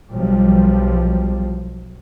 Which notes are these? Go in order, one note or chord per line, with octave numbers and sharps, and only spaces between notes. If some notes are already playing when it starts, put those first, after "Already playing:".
B1 F3 G3